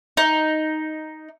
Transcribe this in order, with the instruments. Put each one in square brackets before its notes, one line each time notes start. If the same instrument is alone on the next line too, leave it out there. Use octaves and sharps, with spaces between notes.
[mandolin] D#4